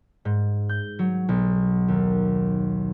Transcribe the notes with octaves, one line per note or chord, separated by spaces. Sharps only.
G#2
G6
F#3
B1
D#2